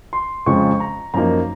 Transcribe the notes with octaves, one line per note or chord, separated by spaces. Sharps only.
C6
F2 C#3 F3 G#3 C#6
A#5
F#2 F3 A#3 D#4 A#5